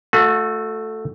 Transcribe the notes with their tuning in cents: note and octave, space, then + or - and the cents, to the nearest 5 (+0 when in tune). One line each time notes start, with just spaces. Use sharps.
A3 +0 F#4 -35